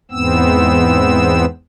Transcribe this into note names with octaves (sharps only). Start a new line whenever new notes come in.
E2 G#2 B3 C4 E6